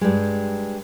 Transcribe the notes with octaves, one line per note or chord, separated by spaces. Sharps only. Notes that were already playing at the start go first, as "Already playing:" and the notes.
G2 G3 G#3